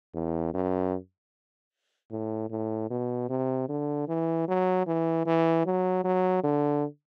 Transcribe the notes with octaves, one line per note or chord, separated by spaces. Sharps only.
E2
F#2
A2
A2
B2
C3
D3
E3
F#3
E3
E3
F#3
F#3
D3